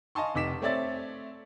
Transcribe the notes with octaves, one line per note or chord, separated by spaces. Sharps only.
D#5 F5 G#5 A5 C6 C#6
F1 D#4 D6 B6 E7
A3 C4 C#5 D5 E5 A6